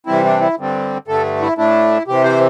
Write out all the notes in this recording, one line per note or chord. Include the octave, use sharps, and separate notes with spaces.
C3 E3 G3 C4 E4
D4
E4
G2 D3 G3 C4
G2 D3 A3 A4
E4
A2 A3 D4 E4
C3 E3 C4 G4
C5